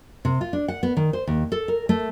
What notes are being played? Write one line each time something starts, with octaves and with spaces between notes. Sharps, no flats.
C3
F4
D4
F#5
B3
D#3
C5
D#2
A4
A#4
A3